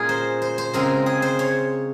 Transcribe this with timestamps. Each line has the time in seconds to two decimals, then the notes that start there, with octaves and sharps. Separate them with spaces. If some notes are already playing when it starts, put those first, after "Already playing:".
Already playing: A#2 G#3 C#4 G#4 A#4
0.09 C5
0.42 C5
0.58 C5
0.74 C#3 G#3 C4 A#4
1.06 G#4
1.22 C5
1.39 C#5